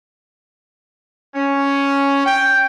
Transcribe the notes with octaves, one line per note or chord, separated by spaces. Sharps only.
C#4
G5